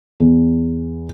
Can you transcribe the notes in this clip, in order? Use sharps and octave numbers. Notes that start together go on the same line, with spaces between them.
E2